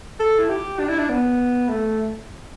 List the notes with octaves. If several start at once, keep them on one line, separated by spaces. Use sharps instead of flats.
A4
E4
G4
D4
E4
D4
B3
A3